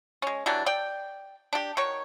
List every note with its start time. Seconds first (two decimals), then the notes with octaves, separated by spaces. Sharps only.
0.22 G#3 C#4
0.46 E3 F#3 G3 D4
0.66 D5 G5
1.53 D4 G4
1.77 D#3 F#4 C#5